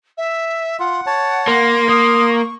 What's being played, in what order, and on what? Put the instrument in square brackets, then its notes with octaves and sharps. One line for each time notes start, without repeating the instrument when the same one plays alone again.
[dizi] E5
[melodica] F4 [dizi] F#5
[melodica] C#5 A5
[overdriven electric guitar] A#3 [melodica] C6
[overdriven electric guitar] A#3 [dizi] D#6
[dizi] C#6